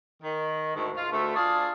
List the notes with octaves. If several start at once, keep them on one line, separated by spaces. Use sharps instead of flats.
D#3
D2 G#2 A3
F4
D2 A3
D4 F4 G#4